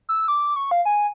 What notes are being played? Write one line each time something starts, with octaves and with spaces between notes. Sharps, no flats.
E6
D6
C#6
F5
G#5